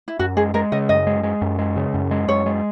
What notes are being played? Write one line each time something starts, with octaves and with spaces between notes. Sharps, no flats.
E4
F#2 F#4
G#3 G#4
G#3 A#4
C#3 D#5
F#2 D#5
G#3
G#3
F#2
G#3
C#3
F#2
G#3
F#2 C#5
G#3